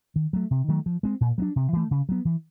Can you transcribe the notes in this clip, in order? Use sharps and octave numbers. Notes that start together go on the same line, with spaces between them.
D#3
F#3 A3
C3
D#3 F#3 A3
F3
G#3 C4
A#2
F#3 A#3 D4
C3
E3 A3
C#3
F#3 B3
E3